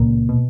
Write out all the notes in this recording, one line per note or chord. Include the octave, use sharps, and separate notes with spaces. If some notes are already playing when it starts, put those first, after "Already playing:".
Already playing: C#2 A#2 A#3
B2